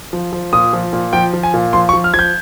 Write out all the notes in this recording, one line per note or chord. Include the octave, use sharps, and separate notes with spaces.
F3
F3
A#2 D#6
F3
A#2
F3 G5
F3
G#5
A#2
F3 C6
C#6
F3
F6
F3 G#6
G6